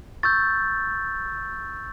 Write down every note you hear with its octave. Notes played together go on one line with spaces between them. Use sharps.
C#6 E6 G6 A6